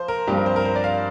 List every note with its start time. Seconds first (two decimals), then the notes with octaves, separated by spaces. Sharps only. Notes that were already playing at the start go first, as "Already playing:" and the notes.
Already playing: F3 C5
0.08 A#4
0.27 G2 F3 C4 G4
0.37 A#4
0.46 C5
0.56 A#4
0.65 C5
0.76 D5
0.84 F5